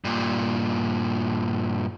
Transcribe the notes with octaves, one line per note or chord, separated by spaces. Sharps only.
G2 A#2